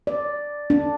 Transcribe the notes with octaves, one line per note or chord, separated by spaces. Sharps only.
D5
D4